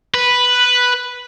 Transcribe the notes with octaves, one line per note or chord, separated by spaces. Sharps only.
B4